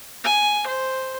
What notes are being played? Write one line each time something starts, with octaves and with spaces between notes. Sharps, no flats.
G#5
C5